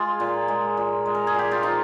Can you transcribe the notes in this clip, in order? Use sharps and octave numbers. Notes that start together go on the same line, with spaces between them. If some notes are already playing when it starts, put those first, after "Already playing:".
Already playing: G#3 F4
A#2
G#3
A#2
G#3
A#4
G#4
A#2 G4
F4
F3 D#4